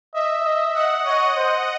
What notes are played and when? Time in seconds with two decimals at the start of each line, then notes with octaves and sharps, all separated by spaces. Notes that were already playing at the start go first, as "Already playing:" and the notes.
0.14 D#5 E5
0.44 D#5
0.75 D#5 F#5
1.05 C#5 D#5
1.36 C5